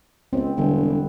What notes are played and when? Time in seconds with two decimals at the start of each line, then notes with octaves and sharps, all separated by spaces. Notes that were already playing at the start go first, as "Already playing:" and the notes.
0.33 C#2 B3 C4
0.57 E1 D3 G3 B3